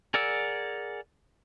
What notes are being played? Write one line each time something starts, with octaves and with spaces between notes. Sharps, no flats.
G#4 A#4 D5 F#5 E6